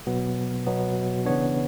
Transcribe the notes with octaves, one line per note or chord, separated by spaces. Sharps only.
B2 F#3 B3
B2 F#3 B3
C#3 E3 B3 D4 C#5